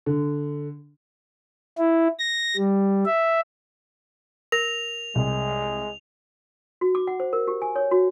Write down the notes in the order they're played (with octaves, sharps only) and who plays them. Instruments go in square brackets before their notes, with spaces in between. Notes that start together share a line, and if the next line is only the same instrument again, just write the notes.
[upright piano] D3
[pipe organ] E4
A#6
G3
E5
[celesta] A#4 A#6 [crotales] F7
[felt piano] C2 [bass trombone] G#3
[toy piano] F#4
D6
F#5
C5
A#4
G4
G#5
C#5
F#4